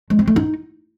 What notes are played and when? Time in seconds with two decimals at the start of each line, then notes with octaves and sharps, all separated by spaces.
0.10 G#3
0.19 C4
0.28 A3
0.36 D#4